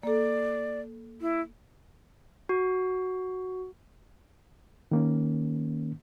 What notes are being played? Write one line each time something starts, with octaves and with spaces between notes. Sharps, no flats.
A#3 A4 D5
E4
F#4
D#3 A#3 C#4